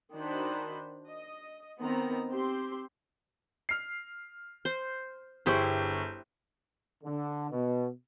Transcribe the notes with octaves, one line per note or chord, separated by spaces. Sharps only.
D#3 D4 D#4 F#4 C5 B5
D#5
D#3 B3 C4 A#5
C4 G4 C6
F6 C7
C5
G1 E4 G4 G#4 C5 C#6
D3
B2